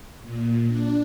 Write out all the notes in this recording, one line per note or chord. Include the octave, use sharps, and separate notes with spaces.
A#2
D4